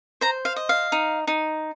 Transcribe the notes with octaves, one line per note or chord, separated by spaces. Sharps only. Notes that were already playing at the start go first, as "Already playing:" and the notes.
C5 A#5
F5
D#5
F5
D#4
D#4